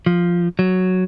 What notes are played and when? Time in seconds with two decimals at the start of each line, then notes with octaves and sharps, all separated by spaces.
0.06 F3
0.59 F#3